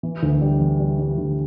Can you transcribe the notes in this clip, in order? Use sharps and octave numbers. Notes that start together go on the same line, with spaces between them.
E3
D2
G3
E3
G3
G3
D2